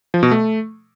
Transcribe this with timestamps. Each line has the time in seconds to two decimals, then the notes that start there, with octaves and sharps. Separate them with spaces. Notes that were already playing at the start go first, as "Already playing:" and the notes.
0.14 F3
0.23 B2
0.31 A3